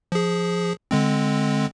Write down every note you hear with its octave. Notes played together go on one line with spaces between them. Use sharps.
F3 G#4
D3 G#3 C4